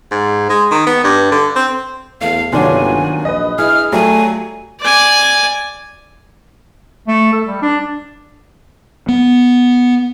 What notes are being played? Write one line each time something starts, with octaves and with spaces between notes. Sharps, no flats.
G#2
G#3
D#3
B3
G2
D3
C4
E2 A3 F5
G1 D#2 C3 F#3 D4 F4 G#5
A#1 B4 D#5
E4 G#4 F6
F#3 G3 A3 F4 G#5
D5 G#5
A3
A4
G3
D4
B3